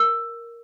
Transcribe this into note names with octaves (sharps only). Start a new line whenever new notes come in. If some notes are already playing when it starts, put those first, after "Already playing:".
Already playing: A#4